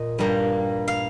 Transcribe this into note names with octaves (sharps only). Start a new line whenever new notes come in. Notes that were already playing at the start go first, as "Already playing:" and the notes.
Already playing: A#2 D#5
G2 G3 A#3
F5